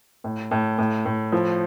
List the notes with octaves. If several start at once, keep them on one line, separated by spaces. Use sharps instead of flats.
A2
A2
A2
A2
F3